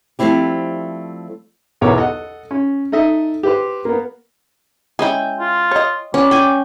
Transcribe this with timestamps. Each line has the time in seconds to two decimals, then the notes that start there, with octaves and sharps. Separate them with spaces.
0.19 F3 G3 A3 C4 E4 G4
1.81 B1 E2 B3 A#4 C#5 D6
1.96 A4 D#5 F#5
2.51 C#4
2.92 D#4 A4 D#5 E5
3.43 G4 B4 C5
3.85 A#3 B3
4.99 G#3 C#4 E4 G5 G#5
5.40 F4
5.71 C#5 D#5
6.14 G3 C#4
6.31 G5 G#5